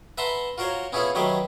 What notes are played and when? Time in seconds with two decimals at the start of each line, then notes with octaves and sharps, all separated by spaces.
0.18 B4 E5 F#5 A5 A#5 C6
0.58 F4 F#4 A#4 C5 C#5
0.93 B3 C#4 E4 F4 G#4 A4
1.15 D#3 F#3 A3 G4 B4 C5